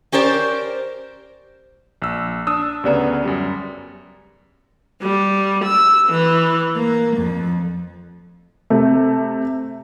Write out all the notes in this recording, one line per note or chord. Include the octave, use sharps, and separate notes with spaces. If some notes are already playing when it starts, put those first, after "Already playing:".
C#4 G4 A#4 C5 D5
A#1 E6
D4 D#6 E6
D2 C#3 B3 G4 D5 A#5
F#2 G3
G3
E6
E3
A#3
F2
C3 A3